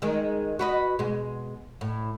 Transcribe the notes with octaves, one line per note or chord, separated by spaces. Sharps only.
D#3 G#3
F#4 B4 D#5
B2 G#3
A2